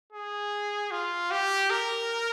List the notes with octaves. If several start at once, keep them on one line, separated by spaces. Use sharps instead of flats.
G#4
F4
G4
A#4